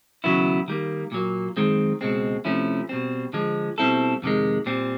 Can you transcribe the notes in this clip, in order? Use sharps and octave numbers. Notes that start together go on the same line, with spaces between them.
D#2 C#3 F#3 B3 E4
D#3 G3 A#3
A#2 F#3 A#3
F#2 D#3 G#3 C4
C#2 B2 G#3 C4
C3 F3 A3 C#4 E4
B2 G3 C4
D3 F3 G#3
B2 G3 C4 E4 A4
F2 C3 D#3 G#3
A#2 G3 C4